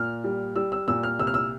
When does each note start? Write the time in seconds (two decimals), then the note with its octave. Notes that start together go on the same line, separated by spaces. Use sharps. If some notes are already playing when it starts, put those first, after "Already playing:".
Already playing: A#2 F6
0.24 G3
0.56 G3 E6
0.72 E6
0.88 A#2 E6
1.03 F6
1.19 C2 E6
1.27 F6
1.34 E6